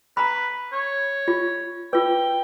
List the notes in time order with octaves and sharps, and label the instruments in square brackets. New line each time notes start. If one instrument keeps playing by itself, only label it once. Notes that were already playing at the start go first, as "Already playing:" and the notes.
[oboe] B4 [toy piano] A#5 B5
[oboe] C#5
[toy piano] F4
[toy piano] F4 B4 [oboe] G5